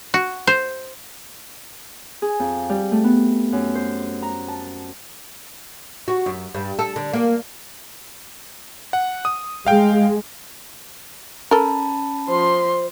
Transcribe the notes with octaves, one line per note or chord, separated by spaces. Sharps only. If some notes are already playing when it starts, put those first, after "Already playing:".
F#4
C5
G#4
F2
G3
A3
B3
F#2
C5
A#5
A5
F#4
F#2
G2
A4
D3
A#3
F#5
D#6
G#3 F5 G5
C#4 A4 A#4 A5 B5
F3 C5 C6